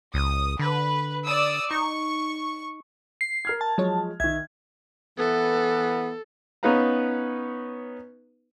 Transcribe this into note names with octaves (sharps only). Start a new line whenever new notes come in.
C#2 D#6
D3 B4
D5 D#6 E6
D#4 C#6
C7
A#4 F6 G#6
A5
F3 F#3 G#3 C#5
B1 D#3 E5 G#6
E3 B3 A4
B3 C#4 D#4 B4 F5 A#5